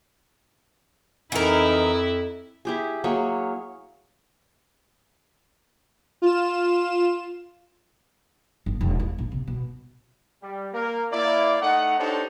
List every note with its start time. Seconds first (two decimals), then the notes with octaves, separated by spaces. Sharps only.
1.32 F2 E3 D#4 E4 A#4
2.65 E4 G4 G#4
3.04 F#3 A#3 G#4 C#5
6.22 F4 E7
8.66 G1
8.81 E1
8.99 E4
9.18 A#1
9.32 C3
9.47 B2
10.42 G3
10.73 A#3 A#4
11.11 A#3 E4 D5
11.61 A3 D#4 D#5 F#5
11.98 D4 D#4 G4 A4 C5 C#5